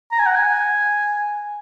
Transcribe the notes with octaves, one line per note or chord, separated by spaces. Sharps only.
A#5
G#5
F#5
G#5